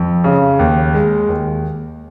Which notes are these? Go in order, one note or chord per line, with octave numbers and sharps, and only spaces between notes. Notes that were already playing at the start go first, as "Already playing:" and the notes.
Already playing: F2
C#3
D#2
G#3
D#2